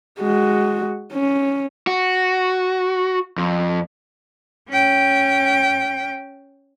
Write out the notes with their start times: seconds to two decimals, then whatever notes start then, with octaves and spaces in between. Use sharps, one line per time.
0.20 G#3 F#4
1.13 C#4
1.87 F#4
3.38 F2
4.69 C#4 G5